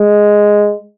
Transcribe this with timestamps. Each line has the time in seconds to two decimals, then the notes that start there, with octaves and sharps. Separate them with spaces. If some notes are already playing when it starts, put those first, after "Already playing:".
Already playing: G#3